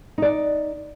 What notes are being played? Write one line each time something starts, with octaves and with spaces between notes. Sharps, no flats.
D#4 D5